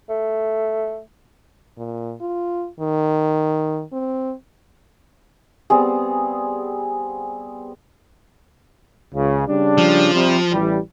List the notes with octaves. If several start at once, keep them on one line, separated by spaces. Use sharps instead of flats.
A3
A#2
F4
D#3
C4
G3 B3 C4 G#4
C#2 C#3
C#3 G3 D4
F3
C3 G3
A1 E3 G3